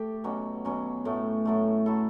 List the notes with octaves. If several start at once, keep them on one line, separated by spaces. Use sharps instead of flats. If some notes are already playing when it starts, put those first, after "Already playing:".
Already playing: A3 G4 A4
B2 F#3 C#4
B2 F#3 C#4
A2 F#3 A3
A2 F#3 A3
F#3 A3 E4 A4